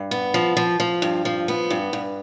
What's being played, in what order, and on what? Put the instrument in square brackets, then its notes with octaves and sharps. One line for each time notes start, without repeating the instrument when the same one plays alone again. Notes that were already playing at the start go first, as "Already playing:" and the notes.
Already playing: [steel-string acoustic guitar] G2
B3
F3
F3
F3
G2
F3
B3
G2
G2